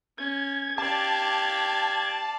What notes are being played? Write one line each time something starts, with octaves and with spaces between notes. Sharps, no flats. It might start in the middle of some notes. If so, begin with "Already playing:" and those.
C#4 G#6
G4 D5 F5 A5